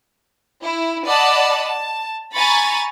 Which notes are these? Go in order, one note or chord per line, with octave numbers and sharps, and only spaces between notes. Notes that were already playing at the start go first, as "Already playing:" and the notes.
E4
D5 D#5 F#5 A5 B5
A5
G#5 A#5 B5 C#6 A6